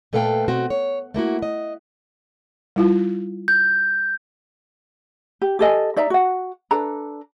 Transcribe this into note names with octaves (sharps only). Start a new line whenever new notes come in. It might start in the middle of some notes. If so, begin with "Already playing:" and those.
A#2 A3 A4 B4 F5 G5
B2 C4 F#4
C#5
A3 A#3 E4 F#4
D#5
G3 E4 F4
G6
G4
G4 A4 D#5 G#5
D#4 D5 E5 A#5
F#4 F#5
D4 A4 B4 A#5